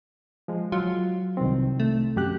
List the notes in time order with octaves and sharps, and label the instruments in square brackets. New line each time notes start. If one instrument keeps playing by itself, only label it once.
[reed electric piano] F3 G#3
[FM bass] F#3 [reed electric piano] F4
[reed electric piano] C2 D#3 C4
[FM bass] A3
[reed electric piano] F#2 G4 F#6